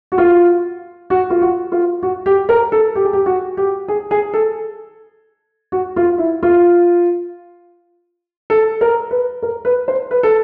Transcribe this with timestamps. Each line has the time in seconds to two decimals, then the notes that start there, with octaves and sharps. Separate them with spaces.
0.12 F#4
0.18 F4
1.10 F#4
1.30 F4
1.42 F#4
1.72 F4
2.03 F#4
2.26 G4
2.49 A#4
2.72 A4
2.95 G4
3.05 G#4
3.13 G4
3.26 F#4
3.57 G4
3.88 G#4
4.11 G#4
4.34 A4
5.72 F#4
5.96 F4
6.18 E4
6.43 F4
8.50 A4
8.81 A#4
9.11 B4
9.42 A#4
9.65 B4
9.88 C5
10.11 B4
10.23 A4